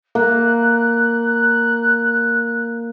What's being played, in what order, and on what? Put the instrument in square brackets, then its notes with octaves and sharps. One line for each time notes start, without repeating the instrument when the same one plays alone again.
[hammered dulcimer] A#3 [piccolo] F#6